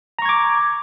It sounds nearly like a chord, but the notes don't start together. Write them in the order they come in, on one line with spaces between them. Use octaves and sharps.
A#5 C#6 G#6 D6